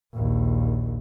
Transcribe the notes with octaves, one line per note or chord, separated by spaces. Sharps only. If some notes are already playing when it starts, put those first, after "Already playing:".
A#1 D#2